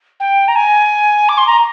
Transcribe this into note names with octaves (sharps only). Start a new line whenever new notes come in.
G5
A#5
G#5
D6
C6
A#5